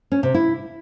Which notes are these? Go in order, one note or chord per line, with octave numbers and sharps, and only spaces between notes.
C#4
C3
E4